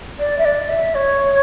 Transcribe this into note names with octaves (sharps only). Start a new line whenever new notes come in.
D5
E5
D5
E5
C#5